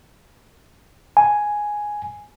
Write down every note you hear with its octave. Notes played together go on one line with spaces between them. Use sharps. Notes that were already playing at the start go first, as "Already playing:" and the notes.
G#5